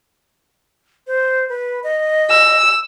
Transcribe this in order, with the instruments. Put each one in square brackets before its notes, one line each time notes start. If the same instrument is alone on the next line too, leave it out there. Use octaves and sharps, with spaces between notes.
[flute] C5
B4
D#5
[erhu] E6